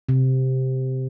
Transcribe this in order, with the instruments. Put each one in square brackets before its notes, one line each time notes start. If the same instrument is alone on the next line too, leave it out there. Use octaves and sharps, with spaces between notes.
[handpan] C3